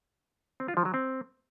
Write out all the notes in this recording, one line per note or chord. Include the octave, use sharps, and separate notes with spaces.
C4
F4
F3
F#3
C4